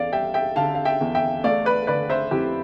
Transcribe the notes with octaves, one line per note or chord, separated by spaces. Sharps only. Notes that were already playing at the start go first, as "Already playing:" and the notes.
Already playing: E2 D5 F5
G3 E5 G5
E5 G5
D3 F5 A5
F5
E5 G5
E2
E5 G5
A3 D5 F5
B4 D5
D3 B4 D5
C5 E5
F2 E4 G4